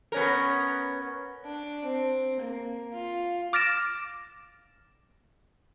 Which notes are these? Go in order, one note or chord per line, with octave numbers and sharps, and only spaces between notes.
B3 C#4 A#4
D4
C4
A#3
F4
D6 F6 A6 A#6 D7 E7